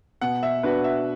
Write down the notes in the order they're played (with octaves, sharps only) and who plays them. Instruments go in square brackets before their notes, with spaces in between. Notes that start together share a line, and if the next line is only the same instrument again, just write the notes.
[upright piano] B2 [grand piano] F#5
[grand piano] E5
[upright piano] B3 D4 F#4 [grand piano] B4
[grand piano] E5